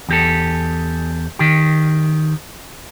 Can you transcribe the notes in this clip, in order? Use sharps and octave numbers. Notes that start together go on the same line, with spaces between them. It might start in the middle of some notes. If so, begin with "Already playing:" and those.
E2 G4 A4
D#3 G4